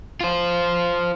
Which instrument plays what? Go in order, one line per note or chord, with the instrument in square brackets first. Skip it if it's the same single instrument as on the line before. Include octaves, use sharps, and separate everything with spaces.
[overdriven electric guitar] F4 C5